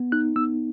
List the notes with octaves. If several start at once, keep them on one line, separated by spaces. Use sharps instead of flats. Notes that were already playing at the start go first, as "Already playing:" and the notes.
Already playing: B3
D#4 F#6
B3 E6